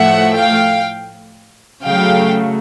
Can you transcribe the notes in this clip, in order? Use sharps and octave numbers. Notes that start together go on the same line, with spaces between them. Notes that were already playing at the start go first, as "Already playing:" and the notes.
Already playing: A2 F3 A3 E5 F#5
F5 G5
C#3 F#3 A3 F5 G5